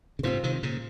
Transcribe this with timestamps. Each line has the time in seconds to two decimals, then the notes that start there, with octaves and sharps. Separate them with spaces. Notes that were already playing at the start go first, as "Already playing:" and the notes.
0.19 C#3
0.23 G#2 C3 C4 F4 C5
0.43 C3 D#3
0.63 A#2 C#3